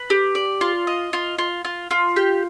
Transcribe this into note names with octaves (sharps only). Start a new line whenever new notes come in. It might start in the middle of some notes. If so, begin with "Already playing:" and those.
Already playing: B4
G4
D5
F4
D#5
F4
F4
F4
F4
G4